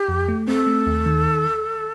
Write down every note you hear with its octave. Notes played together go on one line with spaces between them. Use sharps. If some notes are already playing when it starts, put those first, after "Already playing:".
Already playing: G4
F2
A3
C4 A4
A3
D#2
D#3